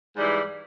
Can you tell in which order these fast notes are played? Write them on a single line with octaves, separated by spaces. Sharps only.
G#2 G3 E3